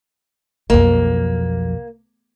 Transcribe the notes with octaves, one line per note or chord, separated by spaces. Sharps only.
B1 F2 A#3